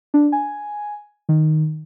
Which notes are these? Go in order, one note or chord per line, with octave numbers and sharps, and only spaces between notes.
D4
G#5
D#3